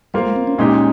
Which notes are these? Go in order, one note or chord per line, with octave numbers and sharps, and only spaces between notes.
G3 A#3 F4 C5
G#3
C4
C#4
A#2 G#3 C#4 D#4 G4